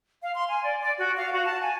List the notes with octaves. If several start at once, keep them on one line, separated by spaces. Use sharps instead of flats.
F5
C6
G#5
D5
D5
F#4
F5
F#4
A5
G#5